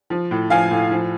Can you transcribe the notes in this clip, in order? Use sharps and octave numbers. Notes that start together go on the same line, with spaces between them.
F3
A2
F3 F5 G#5
A2
F3